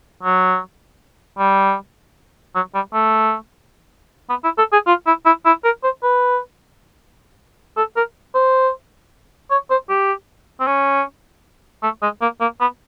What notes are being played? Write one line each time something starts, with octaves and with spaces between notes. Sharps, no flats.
F#3
G3
F#3
G3
A3
B3
E4
A4
G#4
F4
E4
E4
E4
A#4
C5
B4
A4
A#4
C5
C#5
C5
G4
C4
C#4
A3
G#3
A#3
A#3
B3